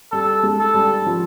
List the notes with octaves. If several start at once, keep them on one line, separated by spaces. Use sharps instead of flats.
G3 A4
G#3
A4
G3
F3